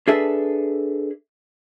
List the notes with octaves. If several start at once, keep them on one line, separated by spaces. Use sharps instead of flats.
D4 G#4 A4 B4 E5